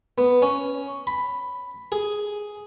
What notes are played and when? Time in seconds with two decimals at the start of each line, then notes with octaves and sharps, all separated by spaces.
0.18 B3
0.42 C#4
1.07 B5
1.92 G#4